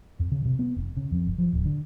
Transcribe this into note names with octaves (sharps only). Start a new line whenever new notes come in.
F2
C#3
C3
B3
F1
C#3
F2
F#1
F3
D1
D3